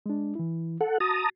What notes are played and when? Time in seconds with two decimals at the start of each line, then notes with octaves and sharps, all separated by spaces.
0.06 G#3 D4
0.35 E3 E4
0.81 A4 F#5
1.00 F#4 A5 A#5 D#6